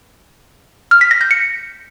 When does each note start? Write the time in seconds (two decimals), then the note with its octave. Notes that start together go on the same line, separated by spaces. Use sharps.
0.91 F6
1.01 B6
1.11 A#6
1.21 G6
1.31 C#7